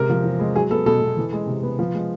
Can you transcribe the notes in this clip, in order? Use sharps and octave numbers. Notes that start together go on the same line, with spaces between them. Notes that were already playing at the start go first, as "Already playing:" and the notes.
Already playing: C3 G#3 A#4
F3
E2
G#3
F#3 G#4
B3 A4
B2 A4
B2
E3
G#3
C3
B3
F3
G#3